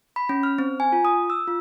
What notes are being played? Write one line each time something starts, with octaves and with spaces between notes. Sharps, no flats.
B5
C#4
F6
C4
G#5
F4
D#6
E6
F4